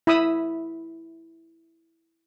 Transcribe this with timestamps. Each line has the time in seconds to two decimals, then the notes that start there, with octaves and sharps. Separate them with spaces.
0.07 E4 B5 D#6 E6